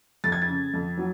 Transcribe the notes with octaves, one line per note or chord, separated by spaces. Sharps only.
F2 A6
G#6
A6
C#3
F2
F#3